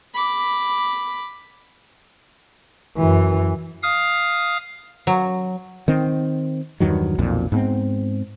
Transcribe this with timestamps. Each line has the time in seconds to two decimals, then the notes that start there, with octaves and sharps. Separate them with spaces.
0.14 B5 D6
2.98 F#2 E3
3.83 F5 D#6 F6
5.07 F#3
5.88 D#3 C4
6.80 E2 G2 D#3 F#3
7.18 B1 F2 A#2
7.52 G#2 B3 C4